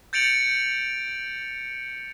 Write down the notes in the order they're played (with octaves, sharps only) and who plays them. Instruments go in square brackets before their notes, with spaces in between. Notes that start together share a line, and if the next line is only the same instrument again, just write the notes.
[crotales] G6 A6 C#7 D7 F7 F#7